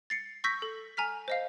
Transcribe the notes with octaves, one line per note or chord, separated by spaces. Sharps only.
A6 C7 C#7
C#6 E6 G6 A#6 B6
A4
G#5 A#5 F6 B6
C5 D#5 F5